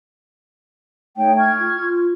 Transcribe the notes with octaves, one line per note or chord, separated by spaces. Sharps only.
A3 D#4 C#5 G5
C#6 F6 G#6
F4
F4